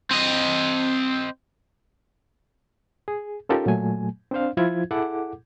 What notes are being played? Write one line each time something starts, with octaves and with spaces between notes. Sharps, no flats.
C4 D#5
G#4
C#4 D#4 F4 G4 A4 A#4
A#2 F#3 A3 G#5
C4 D4 C5 F5
F3 E4 F4 C5 G#6
E4 G#4 A4 F#5 D6